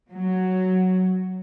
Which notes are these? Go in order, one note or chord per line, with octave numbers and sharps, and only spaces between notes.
F#3